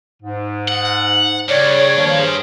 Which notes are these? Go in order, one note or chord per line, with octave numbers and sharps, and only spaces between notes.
G#2
F#5
G2 C#3 C#5 D5
D#3 F3 A#3
G#4 C5 F6